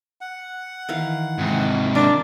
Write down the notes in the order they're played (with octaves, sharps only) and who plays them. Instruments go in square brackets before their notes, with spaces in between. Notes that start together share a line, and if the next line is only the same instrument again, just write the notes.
[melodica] F#5
[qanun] D#3 E3 F5
[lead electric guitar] G#2 C3
[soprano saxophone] D4 [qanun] A#4 [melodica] D5